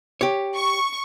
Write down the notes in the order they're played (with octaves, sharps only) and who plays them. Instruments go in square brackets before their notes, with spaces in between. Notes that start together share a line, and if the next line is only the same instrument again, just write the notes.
[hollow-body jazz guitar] G4 C#5
[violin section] C#6